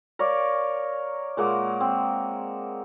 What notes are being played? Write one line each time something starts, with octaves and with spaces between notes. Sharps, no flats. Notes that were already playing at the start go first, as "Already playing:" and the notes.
A#4 C#5 D5 F5
A#2 G#3 A#3 F#5
C4